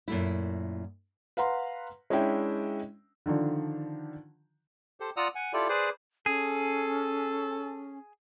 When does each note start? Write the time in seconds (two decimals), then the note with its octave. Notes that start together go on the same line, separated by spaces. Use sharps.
0.08 F#2 A#2 A3 E4
1.37 B4 F5 F#5 A#5 C6
2.10 G#3 C#4 D4 E4 E5 G5
3.26 D3 D#3 F3 D4
5.00 G4 A4 C5
5.17 F4 D5 F#5 A#5 D#6 E6
5.35 F#5 G#5
5.53 E4 F4 G4 A4 D5
5.69 G#4 B4 C5 D5
6.26 C#4 G#4 A4